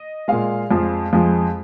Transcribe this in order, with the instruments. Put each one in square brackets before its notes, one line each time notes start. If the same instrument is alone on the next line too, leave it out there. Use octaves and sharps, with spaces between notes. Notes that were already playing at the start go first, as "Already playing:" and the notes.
Already playing: [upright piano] D#5
A#2 G#3 F5
F2 F3 G#3
F2 F3 G#3